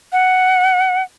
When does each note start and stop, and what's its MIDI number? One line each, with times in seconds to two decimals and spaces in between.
0.12 1.02 78